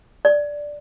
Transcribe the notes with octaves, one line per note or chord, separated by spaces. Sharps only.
D5